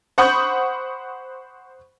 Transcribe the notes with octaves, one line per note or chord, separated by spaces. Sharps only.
C5 F#5 B5 C#6 D#6 G6